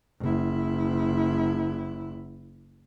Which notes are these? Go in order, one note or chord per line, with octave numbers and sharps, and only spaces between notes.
F#1 E4